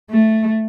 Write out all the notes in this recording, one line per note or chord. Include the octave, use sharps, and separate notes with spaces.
A3